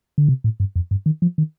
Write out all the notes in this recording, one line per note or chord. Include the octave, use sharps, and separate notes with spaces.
D3
C3
A2
G2
F2
G2
D#3
F3
D#3